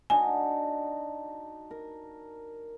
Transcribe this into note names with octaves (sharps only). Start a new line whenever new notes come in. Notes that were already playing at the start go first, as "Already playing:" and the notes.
D4 D#4 F#4 G#5
A#4